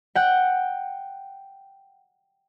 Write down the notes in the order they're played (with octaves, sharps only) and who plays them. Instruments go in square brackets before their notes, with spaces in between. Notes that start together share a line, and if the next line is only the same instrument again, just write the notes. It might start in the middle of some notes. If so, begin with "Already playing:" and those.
[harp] F#5 G5